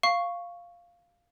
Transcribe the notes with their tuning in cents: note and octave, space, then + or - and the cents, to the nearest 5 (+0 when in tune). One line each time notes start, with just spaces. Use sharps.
F5 +0 C#6 +0